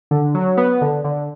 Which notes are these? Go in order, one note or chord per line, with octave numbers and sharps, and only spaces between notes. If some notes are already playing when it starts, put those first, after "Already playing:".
D3
F#3
B3
D3
D3